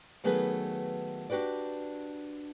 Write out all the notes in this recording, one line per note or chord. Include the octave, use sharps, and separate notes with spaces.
D#3 F#3 A3 B3 G#4 B4
D4 F#4 G4 B4 D5